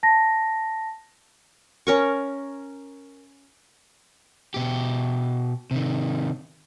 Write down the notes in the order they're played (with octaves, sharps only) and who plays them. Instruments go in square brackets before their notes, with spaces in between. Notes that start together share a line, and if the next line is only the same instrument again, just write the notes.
[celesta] A5 A#6
[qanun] C#4 A#4 C#6
[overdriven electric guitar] B2 G4
C3 D#3